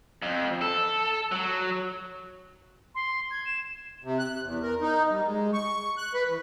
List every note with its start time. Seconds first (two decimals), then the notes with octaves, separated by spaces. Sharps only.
0.22 F2
0.61 A4
1.32 F#3
2.95 C6
3.31 G#6
3.45 E7
4.04 C3
4.19 F#6
4.44 E2
4.63 A#4
4.81 D#4
5.10 G3
5.26 G#3
5.53 C#6
5.98 F#6
6.14 B4
6.28 E3